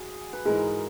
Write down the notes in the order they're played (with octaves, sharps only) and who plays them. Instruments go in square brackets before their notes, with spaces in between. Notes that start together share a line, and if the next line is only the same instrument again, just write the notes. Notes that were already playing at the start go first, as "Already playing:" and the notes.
Already playing: [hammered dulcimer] F#4 G#4
B4
[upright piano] G#2 E3 G#3 [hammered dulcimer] A#4